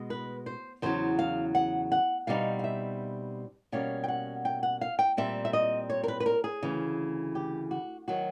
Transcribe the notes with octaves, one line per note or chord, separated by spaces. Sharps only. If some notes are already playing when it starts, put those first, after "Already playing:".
Already playing: B2 G#3
B4
C5
E2 C#3 F#3 C5
F5
F#5
F#5
B2 G3 C4 D#4 F5
F5
E5
B2 G3 A#3 C#4 F5
G5
F#5
G5
F#5
F5
G5
A#2 G3 C4 E5
E5
D#5
C#5
A#4
B4
B4
A#4
G#4
D2 C#3 E3
G4
F#4
D#3 F#3 F#4